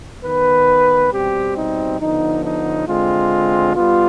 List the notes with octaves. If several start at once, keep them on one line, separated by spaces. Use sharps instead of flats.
D#3 B3 B4
B2 G3 C4 G4
D#4
D3 F3 B3 D#4
D#4
D3 G#3 C4 F4
G3 B3 F4